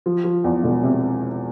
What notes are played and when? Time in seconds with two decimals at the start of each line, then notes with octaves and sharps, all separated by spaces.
0.06 F3
0.24 F3
0.44 E2
0.64 E1
0.83 C3